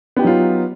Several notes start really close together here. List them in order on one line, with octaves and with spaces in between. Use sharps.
B3 G4 D#4 F#3 F4